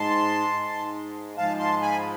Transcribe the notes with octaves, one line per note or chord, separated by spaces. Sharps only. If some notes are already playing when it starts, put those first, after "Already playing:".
Already playing: G#2 G#3 A5 C6
G#2 G#3
G#2 F3 G#3 F5 A5
A5 C6
G#5 B5